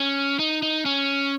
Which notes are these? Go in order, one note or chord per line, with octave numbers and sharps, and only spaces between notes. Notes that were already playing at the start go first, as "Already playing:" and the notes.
Already playing: C#4
D#4
D#4
C#4